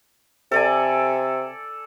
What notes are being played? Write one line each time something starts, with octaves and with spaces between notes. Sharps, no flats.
C3 A4 D5 G#5